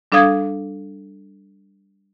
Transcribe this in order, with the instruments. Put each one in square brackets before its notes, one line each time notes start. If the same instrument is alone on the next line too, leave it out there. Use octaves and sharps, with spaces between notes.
[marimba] G3 D4 A4 F5 D#6 G#6